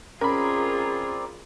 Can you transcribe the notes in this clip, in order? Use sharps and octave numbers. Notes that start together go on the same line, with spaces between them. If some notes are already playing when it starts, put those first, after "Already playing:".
C4 C#4 F4 G#4 A#4 D5 B5